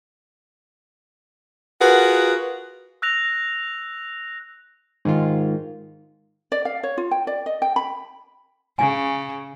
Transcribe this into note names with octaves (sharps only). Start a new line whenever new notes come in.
F4 F#4 G#4 A#4 B4 F#5
E6 F#6 A#6 F7
G#2 D#3 F4
D5
F5
C#5
F4
G5
D5
D#5
G5
B5
C#3 G#5